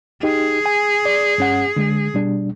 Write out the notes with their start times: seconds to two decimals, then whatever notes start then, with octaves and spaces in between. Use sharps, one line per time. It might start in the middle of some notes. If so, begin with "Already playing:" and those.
0.23 D#4 G4 G#4
0.66 G#5
1.05 D5
1.38 G2 C#4 F#5
1.76 D3 G#3
2.14 B2 G3 D4